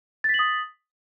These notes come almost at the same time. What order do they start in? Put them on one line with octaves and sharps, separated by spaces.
A6 B6 F#7 D#6